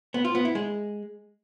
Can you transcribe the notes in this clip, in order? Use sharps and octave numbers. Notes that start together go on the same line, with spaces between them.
B3
F4
B3
E4
G#3